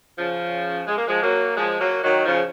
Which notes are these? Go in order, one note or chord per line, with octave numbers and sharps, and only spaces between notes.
C#3 F3
G#3
A#3
F3 G#3
F#3 A#3
F3 G#3
F#3 A#3
D#3 F#3
C#3 F3